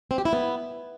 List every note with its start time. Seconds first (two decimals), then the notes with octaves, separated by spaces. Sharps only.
0.11 C4
0.18 G4
0.25 E4
0.33 B3